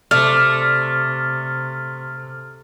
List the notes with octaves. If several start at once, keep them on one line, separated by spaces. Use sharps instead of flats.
C3 A3 D5 F6